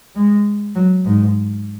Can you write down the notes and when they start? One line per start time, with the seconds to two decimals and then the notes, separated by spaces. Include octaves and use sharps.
0.15 G#3
0.75 F#3
1.05 G#2